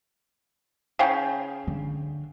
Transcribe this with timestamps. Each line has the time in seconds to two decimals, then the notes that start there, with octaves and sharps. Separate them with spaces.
0.99 C#3 F5 G5
1.67 D3